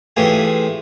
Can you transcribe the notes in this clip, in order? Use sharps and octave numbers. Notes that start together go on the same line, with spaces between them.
A2 E3 F4 G4 G#4